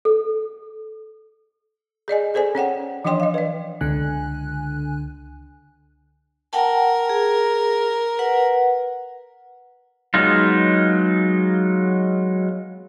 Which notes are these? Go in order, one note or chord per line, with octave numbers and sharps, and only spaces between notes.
A4
G#4 D5 D#5 G#5
G#4 A4 C5 D5 G#5
C#4 C#5 F#5 G5
E3 F3 D4 C#5 G5 C6
D#5 F5
B4 D5
C#2 D3 G#5 F#6
A#4 F#5 G5 A5
G#4
B4 F#5
F#3 G#3 B3 D#4 F4